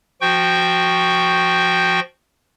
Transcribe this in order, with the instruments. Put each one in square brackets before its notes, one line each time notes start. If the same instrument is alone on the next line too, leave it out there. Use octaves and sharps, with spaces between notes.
[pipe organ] F3 F#4 G5 C#6 G6